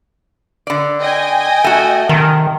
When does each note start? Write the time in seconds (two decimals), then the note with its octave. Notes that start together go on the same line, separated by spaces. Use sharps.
0.67 D3 D5
1.01 D#5 G5 G#5
1.64 A3 F#4
2.09 C3 D#3